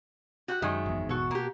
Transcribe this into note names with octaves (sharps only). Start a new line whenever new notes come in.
F#4 G4 F#5 F#6
F#2 D#3 F#3 G#3 E5
G#1 E2
B2 F#4 A4
A#3 G4